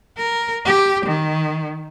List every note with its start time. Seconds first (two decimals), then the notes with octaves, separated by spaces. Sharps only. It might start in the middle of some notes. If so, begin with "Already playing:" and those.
0.18 A#4
0.65 G4
1.06 D#3